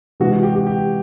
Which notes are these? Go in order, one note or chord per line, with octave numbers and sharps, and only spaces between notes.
C3 E3 G#3 F#4
F#4
G4
G4
G4